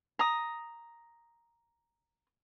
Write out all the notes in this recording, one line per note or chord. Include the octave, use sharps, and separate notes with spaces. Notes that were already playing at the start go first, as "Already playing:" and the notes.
A#5 D#6